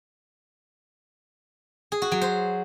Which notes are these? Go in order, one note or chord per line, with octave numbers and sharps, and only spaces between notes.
G#4
F#4
F#3
C5